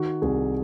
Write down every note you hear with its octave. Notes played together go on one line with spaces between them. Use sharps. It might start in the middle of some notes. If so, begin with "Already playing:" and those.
Already playing: D#3 F#4
C2 G#4